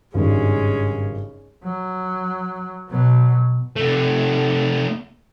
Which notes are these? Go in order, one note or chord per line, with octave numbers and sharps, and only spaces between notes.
G#1 G2 C#3 G#3 C#4
F#3
B2 F#3
C3 A3